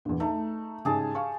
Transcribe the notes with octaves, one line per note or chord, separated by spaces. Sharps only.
A#1 E2
A3 D#4
G#2 C#3 G4 G#4 A5
F5 C#6